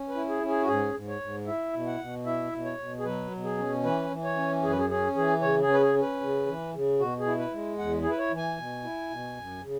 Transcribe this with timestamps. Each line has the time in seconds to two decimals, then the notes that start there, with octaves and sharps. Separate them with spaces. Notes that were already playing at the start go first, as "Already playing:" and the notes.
Already playing: C#4
0.09 B4
0.15 E4
0.29 G#4
0.42 C#4
0.48 G#4
0.62 F#4
0.68 G#2 G#4
0.94 G#2
1.08 C#5
1.21 G#2
1.47 E4 E5
1.73 B2
1.87 F#5
2.00 B2
2.26 E4 E5
2.52 B2
2.65 C#5
2.78 B2
2.99 G#4
3.05 F#3 B4
3.32 B2
3.44 G#4
3.57 C#4
3.84 E3 B4
4.10 E3
4.24 C#5
4.37 C#4
4.63 F#2 G#4
4.71 B4
4.78 G#4
4.89 C#4 G#4
5.15 E3 G#4
5.42 C#3 C#5
5.62 G#4
5.67 C#4
5.73 B4
5.81 G#4
5.94 C#4
6.02 B4
6.21 C#3
6.46 E3
6.74 C#3
6.99 B2 F#4
7.19 G#4
7.26 E4
7.39 B4
7.53 G#3
7.78 E2 F#5
8.02 E4 G#4
8.10 B4
8.18 C#5
8.31 E3
8.37 G#5
8.58 B2
8.84 E4
9.10 B2
9.37 F#2
9.63 C#3